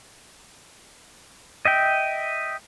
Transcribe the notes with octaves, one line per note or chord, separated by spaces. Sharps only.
D#5 E5 G5